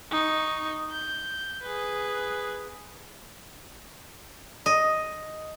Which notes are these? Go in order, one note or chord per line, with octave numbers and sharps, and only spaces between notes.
D#4 C#6
G6
G#4 B4
D#5